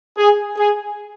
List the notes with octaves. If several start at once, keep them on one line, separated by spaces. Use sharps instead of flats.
G#4
G#4